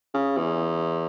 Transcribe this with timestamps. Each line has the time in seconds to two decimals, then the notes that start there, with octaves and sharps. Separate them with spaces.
0.14 C#3
0.37 E2